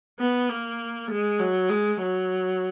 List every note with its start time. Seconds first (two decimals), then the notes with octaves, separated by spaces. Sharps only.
0.19 B3
0.50 A#3
1.10 G#3
1.40 F#3
1.70 G#3
2.01 F#3